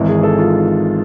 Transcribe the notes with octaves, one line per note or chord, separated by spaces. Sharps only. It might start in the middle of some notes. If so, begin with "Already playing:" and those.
Already playing: G#1 G#2 E3
G#4
A4
F4